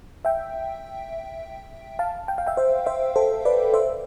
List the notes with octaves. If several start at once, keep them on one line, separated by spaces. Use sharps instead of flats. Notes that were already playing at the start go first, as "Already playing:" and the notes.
E5 G5
F5 A5
G5
F5
E5 G5
C5 E5
C5 E5
A4 C5
B4 D5
C5 E5